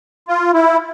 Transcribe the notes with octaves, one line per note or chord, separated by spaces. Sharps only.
F4
E4